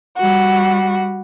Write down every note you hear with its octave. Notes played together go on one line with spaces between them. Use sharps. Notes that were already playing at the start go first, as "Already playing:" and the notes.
G3 F#4